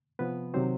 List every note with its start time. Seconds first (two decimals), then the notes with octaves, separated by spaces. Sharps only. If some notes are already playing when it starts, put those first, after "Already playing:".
0.19 C3 F3 B3 B4
0.54 C3 D#3 F#3 C4 C5